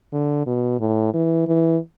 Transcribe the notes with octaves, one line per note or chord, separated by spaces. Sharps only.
D3
B2
A2
E3
E3